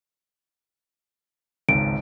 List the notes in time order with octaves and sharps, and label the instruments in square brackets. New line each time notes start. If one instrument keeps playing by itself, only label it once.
[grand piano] G#1 C#2 [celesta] D7